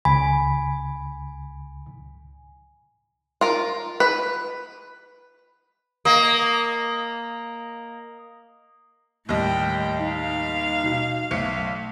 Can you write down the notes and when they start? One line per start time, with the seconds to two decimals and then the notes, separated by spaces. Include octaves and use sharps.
0.05 C#2 G#5 B5
3.41 F4 A#4
4.00 B4
6.05 A#3 D#5
9.29 D#2 A2 G3 D#5 G5
10.00 D#4 F5
10.84 B2
11.31 B1 A3 C#7